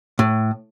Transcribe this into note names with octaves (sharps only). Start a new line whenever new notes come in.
A2